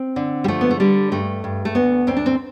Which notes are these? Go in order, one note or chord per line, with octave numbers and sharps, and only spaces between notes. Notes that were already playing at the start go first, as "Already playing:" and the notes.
Already playing: C4
D3
G3
F3 A3
B3
A3
D3 G3
G2 A3
G2
A3
D2 B3
D2 C4
D4
C4